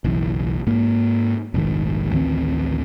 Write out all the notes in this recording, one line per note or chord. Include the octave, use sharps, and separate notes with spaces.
F#1 B1 E3
G#2 A#3
F1 A#1 G#2 D#3
A1 D2 D#3 C4